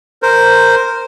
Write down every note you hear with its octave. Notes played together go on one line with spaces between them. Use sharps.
A#4 C5